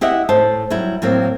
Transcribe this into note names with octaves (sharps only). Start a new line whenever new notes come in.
E4 G4 D#5 E5 F#5
A2 C5 A5
F#3 G3 E4
A2 F#3 A#3 C4